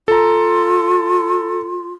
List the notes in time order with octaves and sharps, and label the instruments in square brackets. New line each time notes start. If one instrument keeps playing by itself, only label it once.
[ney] F4 [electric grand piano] A4 A#5